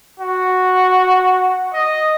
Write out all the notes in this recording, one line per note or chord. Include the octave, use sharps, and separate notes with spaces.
F#4
D#5